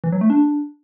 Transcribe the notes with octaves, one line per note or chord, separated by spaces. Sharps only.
E3
F#3
A3
D4